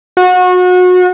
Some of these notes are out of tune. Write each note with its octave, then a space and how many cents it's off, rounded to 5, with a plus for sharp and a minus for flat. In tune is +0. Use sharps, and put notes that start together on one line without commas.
F#4 -30